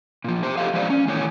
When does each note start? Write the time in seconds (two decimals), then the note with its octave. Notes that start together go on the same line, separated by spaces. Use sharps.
0.24 A#2 F3
0.43 G4 C5
0.58 G4 A4 C5 D#5 F5
0.74 F3 G#3 B4 C5 D5 F5
0.90 C#4
1.07 E2 A2 D#3 C#5 G#5